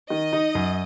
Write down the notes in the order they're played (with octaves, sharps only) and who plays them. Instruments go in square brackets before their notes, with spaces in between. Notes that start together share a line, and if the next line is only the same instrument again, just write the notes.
[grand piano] D#3 [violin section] D#5
[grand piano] D#4
F#2